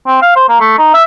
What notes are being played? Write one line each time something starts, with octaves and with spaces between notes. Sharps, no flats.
C4
F5
C5
A#3
A3
D#4
E5